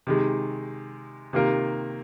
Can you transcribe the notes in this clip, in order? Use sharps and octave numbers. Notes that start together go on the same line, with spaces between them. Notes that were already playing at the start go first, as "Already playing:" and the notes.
C3 D#3 G#3
C3 D#3 A#3 F4 A#4